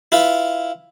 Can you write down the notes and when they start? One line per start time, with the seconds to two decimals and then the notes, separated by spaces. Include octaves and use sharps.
0.12 E4 F4 B4